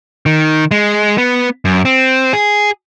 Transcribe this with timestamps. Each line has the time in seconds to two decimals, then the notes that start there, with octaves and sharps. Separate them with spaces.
0.26 D#3
0.71 G#3
1.18 B3
1.65 F#2
1.85 C4
2.33 G#4